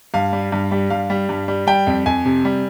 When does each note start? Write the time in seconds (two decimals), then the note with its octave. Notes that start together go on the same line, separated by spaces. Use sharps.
0.14 G2 F5
0.33 G3
0.52 G2
0.72 G3
0.90 G2 F5
1.10 G3
1.29 G2
1.48 G3
1.67 G3 G5
1.87 F2
2.06 F2 G#5
2.25 C3
2.45 G3